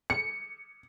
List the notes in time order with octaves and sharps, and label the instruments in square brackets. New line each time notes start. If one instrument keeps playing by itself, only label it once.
[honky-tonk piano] C#7